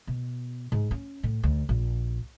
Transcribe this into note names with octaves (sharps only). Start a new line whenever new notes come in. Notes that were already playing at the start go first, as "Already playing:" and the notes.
B2
G#2
C#4
A2
D2
A#1